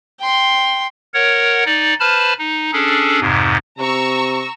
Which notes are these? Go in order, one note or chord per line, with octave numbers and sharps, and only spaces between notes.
G5 C6
A#4 C#5 F#5
D#4 D5
B4 C5 A5 B5 F6
D#4
C#4 D4 G#4 A4
F2 G#2 C3
C3 A#5 C#6 E6